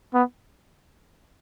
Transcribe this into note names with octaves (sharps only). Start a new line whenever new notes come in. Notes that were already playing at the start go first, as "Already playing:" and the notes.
B3